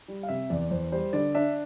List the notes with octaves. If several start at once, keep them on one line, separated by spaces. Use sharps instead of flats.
G3
F5
C3 E5
E2 D5
E2 C5
G3 C5
D3 D5
D4 E5